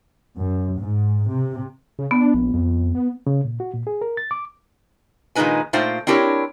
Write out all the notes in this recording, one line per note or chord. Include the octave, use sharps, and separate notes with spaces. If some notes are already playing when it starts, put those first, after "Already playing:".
F#2
G#2
C3
C#3
B3 D4
A#1
F2
B3
C#3
A#2
F#4
A#2
G#4
A#4
A6
D6
A#2 D#3 G#3 D#4 B4 G#5
A#2 A3 D#4 F4 C5 G5
C4 D4 E4 G4 A#4 C#5